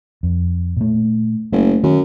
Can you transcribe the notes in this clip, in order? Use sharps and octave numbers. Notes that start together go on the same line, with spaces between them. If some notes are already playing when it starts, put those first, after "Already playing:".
F2
A#2 A3
F#1 A3
F#2 D#3